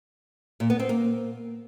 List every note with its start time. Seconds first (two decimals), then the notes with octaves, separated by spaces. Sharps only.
0.60 A#2
0.70 B3
0.79 C4
0.89 A#3